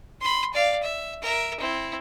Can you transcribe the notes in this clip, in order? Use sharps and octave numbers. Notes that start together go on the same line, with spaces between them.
B5 C6
D5 F5
E5
A#4 E5
C4 E4